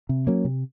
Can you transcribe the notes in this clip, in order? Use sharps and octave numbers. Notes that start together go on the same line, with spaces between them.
C3
F#3 A#3 C#4
C3